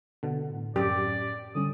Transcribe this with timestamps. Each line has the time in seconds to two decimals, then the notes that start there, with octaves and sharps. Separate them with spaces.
0.23 B2 D3
0.49 A2
0.76 F#2 G4 D5
1.55 D3 G3 C#4 D#6